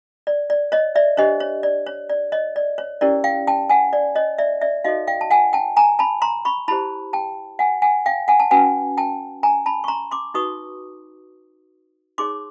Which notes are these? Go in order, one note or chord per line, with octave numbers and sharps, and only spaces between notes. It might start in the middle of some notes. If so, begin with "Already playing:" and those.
D5
D5
C#5 D#5
D5 E5
D4 G4 C5 C#5 D#5
C#5
D5
C#5
D5
C#5 D#5
D5
C#5
C#4 E4 G4 A#4 C#5 D5
F5 G5
G5 A5
F#5 G#5
D5
C#5 D#5
D5 E5
D5 E5
D#4 F#4 A4 C#5 D#5 F5
F5 G5
A5
F#5 G#5
G5 A5
G#5 A#5
A5 B5
A#5 C6
B5 C#6
E4 G4 C5 A5 B5
G5 A5
F#5 G#5
F#5 G#5
F5 G5
F#5 G#5
A5
C#4 F#4 B4 F#5 G#5
G5 A5
G#5 A#5
A5 B5
C#6
A#5 C6
C6 D6
D#4 F#4 B4 C#6 D#6
D#4 G#4 C#5 C6 D6